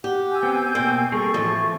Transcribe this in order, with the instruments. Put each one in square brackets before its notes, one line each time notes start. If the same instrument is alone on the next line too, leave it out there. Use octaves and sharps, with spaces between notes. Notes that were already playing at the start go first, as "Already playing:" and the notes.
[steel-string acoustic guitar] G4 [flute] F#5
[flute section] G#5 E6 G6
[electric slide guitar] B3 C4 [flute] G5
[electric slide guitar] B2 A#3 [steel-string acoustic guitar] C4 [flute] G5
[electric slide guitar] G3 A#3 G#4 [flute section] A4 [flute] C#6
[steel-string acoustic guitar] A2 F3 A5 [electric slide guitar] E3 A3 C4